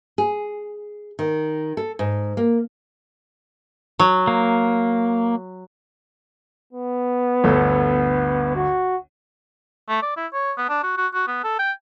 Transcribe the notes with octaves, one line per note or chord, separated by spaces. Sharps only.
G#4
D#3
A4
G#2
A#3
F#3
A#3
B3
G1 D2 A4
F#4
A3
D5
E4
C#5
B3
D4
F#4
F#4
F#4
B3
A4
G5